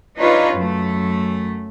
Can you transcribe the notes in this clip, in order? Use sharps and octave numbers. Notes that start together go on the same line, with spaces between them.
D4 D#4 F4 G4 B4 C#5
F#2 A3